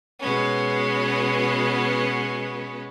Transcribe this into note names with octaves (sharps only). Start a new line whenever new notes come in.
B2 G#3 B3 C#4